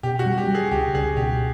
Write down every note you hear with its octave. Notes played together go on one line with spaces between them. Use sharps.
B2 G4
F#4
G3
G4
G3
G#4
C#2 G4
C#2 G#4
B2 G4